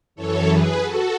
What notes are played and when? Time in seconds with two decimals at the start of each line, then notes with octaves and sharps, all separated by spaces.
0.15 F#2 E3 A4 C#5
0.47 G#4 B4
0.80 F#4 A4